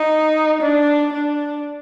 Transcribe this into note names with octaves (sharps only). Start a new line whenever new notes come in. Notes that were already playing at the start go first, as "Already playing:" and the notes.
Already playing: D#4
D4
D4